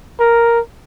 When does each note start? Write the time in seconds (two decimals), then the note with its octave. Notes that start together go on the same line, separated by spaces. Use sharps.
0.20 A#4